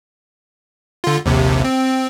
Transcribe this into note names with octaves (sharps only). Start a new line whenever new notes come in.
D3 F4
A#1 D#2 C3
C4